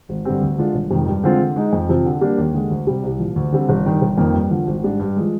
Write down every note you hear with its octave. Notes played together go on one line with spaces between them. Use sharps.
G#1
G2 D3 G3 C4
D2
D3 G#3 D4 F4
G1
F2 C3 D#3 G#3
G2
D3 G#3 C4 F4
D3
G#3 D#4
F2
C3 F3 C4
D3
G3 A#3 D4 G4
D#2
D3 G#3
D2
C3 G3
C2
A#2 F3
D2
D3 G3 C4
G1
G2 D#3
G1
F2 D#3 A#3
G2
D3 F3
G#1
G#2 G3 D4
G2
F3 G#3